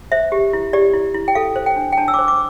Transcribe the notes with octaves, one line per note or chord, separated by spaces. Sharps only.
C5 E5
G4
E4
G4 D5
E4
E4
G5
A4 F5
C5
G5
D4
G5
D4 A5
E6
C5 D6
D6